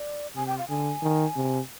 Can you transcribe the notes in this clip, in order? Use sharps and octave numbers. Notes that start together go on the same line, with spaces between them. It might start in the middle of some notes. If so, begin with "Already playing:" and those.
Already playing: D5
C3 G#5
G5
F5
D3 G#5
D#3
C3